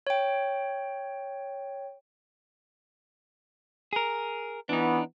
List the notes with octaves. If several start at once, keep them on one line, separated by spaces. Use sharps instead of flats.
C#5 G5
G#4 A#4
E3 B3 D4 D#4